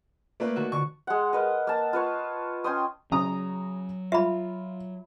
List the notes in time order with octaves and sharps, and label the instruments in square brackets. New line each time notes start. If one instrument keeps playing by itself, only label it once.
[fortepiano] A3 A#3 B4 [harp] D5
[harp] D#3 F#4 A4
[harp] D3 [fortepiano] C#6
[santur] G#3 F#5
A#4 B4 D#5
A#3 A5
F4 B4 C#5
C#4 G5 C6 D#6
[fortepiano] C#3 A#5 D#6 [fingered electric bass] F#3
[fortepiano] F4 [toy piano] E5 B5